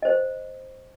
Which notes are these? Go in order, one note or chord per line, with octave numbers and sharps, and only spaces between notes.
C5 D#5